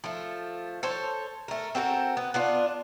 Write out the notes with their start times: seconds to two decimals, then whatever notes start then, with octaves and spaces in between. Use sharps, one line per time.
0.04 F3 A3
0.83 A4 C5 C#5
1.48 A3 A#4
1.75 C4 F#4 A4 A#4
2.17 B3
2.34 B3 D4 F4